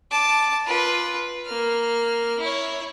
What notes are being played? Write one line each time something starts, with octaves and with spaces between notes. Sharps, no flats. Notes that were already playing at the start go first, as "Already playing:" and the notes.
A5 D6
F4 B4
A#3 F6
E4 C#5